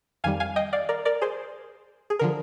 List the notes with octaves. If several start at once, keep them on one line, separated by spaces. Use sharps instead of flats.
F2 D#3 G3 F5 G#5
F5 G#5
D#5 G5
D5 F5
A#4 D5
A#4 D5
G#4 C5
G#4
D3 F3 A#4